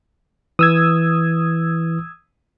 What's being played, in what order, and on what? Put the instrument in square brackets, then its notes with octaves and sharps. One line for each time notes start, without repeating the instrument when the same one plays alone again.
[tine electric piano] E3 [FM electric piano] D#6 E6 G#6